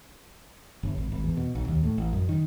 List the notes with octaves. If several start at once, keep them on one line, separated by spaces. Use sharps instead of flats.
G1
G#1
G#1
E2
B2
B1
D#2
A2
A1
F#2
D#3